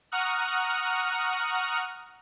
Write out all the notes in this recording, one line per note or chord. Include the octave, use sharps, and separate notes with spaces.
F#5 A#5 C#6 D#6 F6 F#6